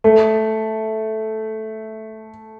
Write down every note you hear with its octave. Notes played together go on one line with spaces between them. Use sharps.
A3